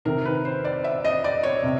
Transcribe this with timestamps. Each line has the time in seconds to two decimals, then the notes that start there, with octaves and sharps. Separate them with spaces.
0.05 C3 D#3 A#4
0.25 B4
0.45 C5
0.64 D5
0.84 E5
1.04 D#5
1.24 D5
1.43 C#5
1.63 C3